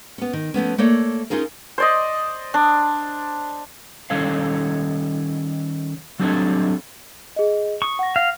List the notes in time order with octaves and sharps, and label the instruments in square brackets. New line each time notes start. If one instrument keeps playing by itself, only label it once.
[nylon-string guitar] B3 C#4
D#3
F3 A3 B3 C#4
A3 A#3 A4 C#5 D5
C#4 D#4 F4 G#4 A#4
[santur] C5 D5 D#5
D4
[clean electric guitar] D#3 G3 C#4 A4 C#5 F5
F#3 G3 C4 D4 A4 C#5
[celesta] G#4 D#5
[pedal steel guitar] C#6 [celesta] D#6
[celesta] F#5 A#6
[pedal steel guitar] F5